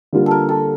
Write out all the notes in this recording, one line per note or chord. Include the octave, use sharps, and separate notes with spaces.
D3 G3 A#3 F4
A4 A#4
A4